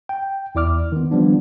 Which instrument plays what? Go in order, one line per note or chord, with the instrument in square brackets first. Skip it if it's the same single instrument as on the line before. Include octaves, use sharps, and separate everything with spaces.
[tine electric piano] G5
E2 E4 D5 D6 F6
D#3 B3
D#3 F3 G3 B3 D4